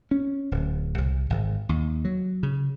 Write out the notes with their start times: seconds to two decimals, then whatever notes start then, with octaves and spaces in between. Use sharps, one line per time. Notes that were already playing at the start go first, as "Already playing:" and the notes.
0.11 C#4
0.51 D1
0.98 C2
1.30 G#1
1.69 D#2
2.05 F#3
2.43 C#3